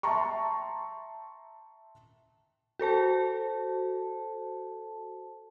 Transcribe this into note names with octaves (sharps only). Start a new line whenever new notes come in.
E5 G5 A5 A#5 C6 C#6
F#4 A4 C5 A5